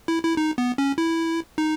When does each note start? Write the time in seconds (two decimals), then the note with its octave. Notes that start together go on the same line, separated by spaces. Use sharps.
0.08 E4
0.24 E4
0.37 D#4
0.58 B3
0.78 C#4
0.98 E4
1.58 D#4